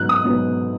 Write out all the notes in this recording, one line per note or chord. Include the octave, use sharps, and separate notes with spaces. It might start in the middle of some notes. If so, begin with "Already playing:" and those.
Already playing: G#2 F#3 B3 F#6
D#6
G#2 F#3 B3